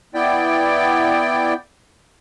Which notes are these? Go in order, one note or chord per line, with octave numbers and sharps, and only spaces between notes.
B3 E4 D5 G5